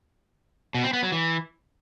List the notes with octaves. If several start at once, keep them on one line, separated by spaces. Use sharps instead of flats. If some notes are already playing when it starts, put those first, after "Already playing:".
B2
C4
B3
F#3
E3